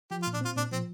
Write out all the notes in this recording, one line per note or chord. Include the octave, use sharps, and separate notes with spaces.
F3 G4
F4
A#2
D4
C4 F4
A#2 D4
F3 C4